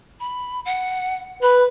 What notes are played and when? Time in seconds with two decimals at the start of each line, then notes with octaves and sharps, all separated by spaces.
0.20 B5
0.65 F#5
1.42 B4 B5